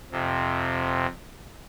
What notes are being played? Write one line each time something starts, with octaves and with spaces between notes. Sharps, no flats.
F2 C3